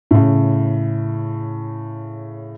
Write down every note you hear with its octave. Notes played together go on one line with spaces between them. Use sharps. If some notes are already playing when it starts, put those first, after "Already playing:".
A2 C#3